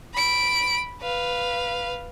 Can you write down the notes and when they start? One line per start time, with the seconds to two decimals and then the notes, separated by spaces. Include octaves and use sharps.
0.14 B5 D7
1.01 B4 F5